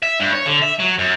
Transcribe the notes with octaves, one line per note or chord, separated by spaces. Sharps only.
E5
G2
C#5
D3
E5
F#3
F#2